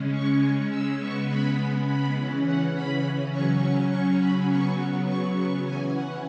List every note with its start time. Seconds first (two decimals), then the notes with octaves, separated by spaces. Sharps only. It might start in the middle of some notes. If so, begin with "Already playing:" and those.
Already playing: C#3 G#3 C#4
0.12 C#6
0.70 E6
0.99 C#3 G#3 B3 C#6
1.28 B5
1.87 B5
2.15 C#3 E3 C#4
2.45 F#5
2.74 B5
3.32 C#3 F#3 C#4 C#6
3.61 C#6
3.89 C#6
4.19 B5
4.48 C#3 F#3 B3 C#6
5.06 C#6
5.36 C#6
5.64 E3 C#4 G#5
5.93 F#5